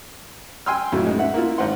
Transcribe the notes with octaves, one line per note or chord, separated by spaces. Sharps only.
G5 G#5 C6 E6 F6
F2 A2 F#3
G#3 D#4
E5 F#5
A#3 E4 F4
G#1 C5 F#5 C6